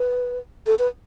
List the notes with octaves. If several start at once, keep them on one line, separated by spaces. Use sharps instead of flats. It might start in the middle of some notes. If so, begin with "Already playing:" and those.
Already playing: B4
A4
B4